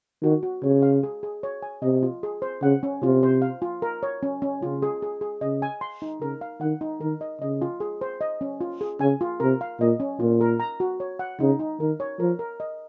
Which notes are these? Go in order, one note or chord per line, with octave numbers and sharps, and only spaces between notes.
D#3 F#4
F#4
C#3 C#5
F5
G#4
G#4
C#5
G#5
C3 D#5
F4
G#4
C5
C#3 F#5
C#4
C3 F4
C5
F5
F4
A#4
C#5
C#4
C#4
C#3 F4
G#4
G#4
G#4
C#3 D#5
G#5
C6
D#4
C#3 A#4
F5
D#3 F#5
D#4
D#3 A#4
D#5
C#3 D#5
F4
G#4
C5
D#5
C#4
F4
G#4
C#3 G#5
F4
C3 A#4
F5
A#2 D#5
C#4
A#2 F4
A#4
A#5
F#4
C#5
F#5
C#3 D#4
D#4
D#3 A#4
C#5
F3 A#4
A#4
D#5